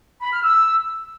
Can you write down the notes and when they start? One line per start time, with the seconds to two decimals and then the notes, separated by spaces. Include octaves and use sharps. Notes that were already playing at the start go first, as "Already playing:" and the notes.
0.22 B5
0.33 F6
0.43 E6